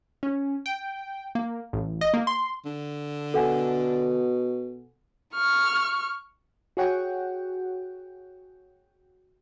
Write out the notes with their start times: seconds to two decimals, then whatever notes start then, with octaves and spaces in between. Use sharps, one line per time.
0.23 C#4
0.66 G5
1.35 A#3
1.73 A1
2.01 D#5
2.14 A#3
2.27 C6
2.65 D3
3.34 B2 A4 F#5 G#5
5.34 C#6 F6
6.77 F#4 G#4 C#5 F#5 G5